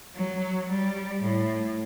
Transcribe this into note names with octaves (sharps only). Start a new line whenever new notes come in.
F#3
G3
A2